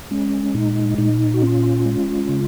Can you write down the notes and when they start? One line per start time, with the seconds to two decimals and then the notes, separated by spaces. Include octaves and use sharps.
0.11 G#3 C#4
0.54 A#2 D#4
0.98 A#2 D#4
1.34 F#4
1.42 C#4 F4
1.85 G#3
2.29 C#3